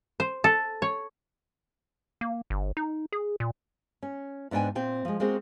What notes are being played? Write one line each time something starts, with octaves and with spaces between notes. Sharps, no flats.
C5
A4
C#5
A#3
G1
D#4
G#4
A#2
C#4
G#2 B3 D4 B4 G5 G#5
A#2 C4 G5
F3 G#3
G#3 A#3 C4 F#4 G#4 C5